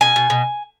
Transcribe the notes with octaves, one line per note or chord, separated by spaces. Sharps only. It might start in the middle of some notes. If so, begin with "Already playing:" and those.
B2 G#5
B2
B2